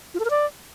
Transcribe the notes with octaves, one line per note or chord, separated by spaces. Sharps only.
F4
A4
A#4
D5